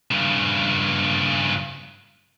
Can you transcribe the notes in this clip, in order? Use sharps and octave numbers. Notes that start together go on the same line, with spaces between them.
G2 C#3